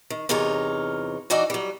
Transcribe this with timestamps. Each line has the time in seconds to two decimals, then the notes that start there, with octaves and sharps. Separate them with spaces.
0.10 D#3
0.29 E2 C3 D#4 F4 A#4 C#5
1.30 E3 D#4 F#4 D5 D#5
1.50 F#3 G3